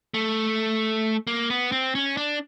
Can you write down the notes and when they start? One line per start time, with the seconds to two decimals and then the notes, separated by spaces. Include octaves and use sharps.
0.14 A3
1.27 A#3
1.50 B3
1.72 C4
1.95 C#4
2.17 D4